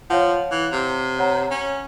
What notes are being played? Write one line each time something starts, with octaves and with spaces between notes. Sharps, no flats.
F3 C#5 F5 F#5
E3
C3
C#5 F#5 A#5
C#4